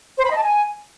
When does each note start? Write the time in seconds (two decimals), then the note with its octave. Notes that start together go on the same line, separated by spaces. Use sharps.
0.17 C5
0.24 B5
0.30 D#5
0.37 A5
0.44 G#5